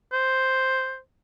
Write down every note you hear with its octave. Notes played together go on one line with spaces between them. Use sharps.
C5